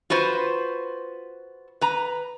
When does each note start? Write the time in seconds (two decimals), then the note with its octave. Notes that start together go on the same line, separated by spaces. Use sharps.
0.10 F4 F#4 B4 C5
1.81 B4 A#5